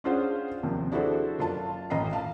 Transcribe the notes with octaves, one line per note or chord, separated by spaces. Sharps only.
C#4 D4 F4 G#4 C5 F#5
D#2 C3 F3
D4 E4 F#4 G#4 A4 C5
F#1 F4 A5
A1 D#5 A#5 C7
F5 A5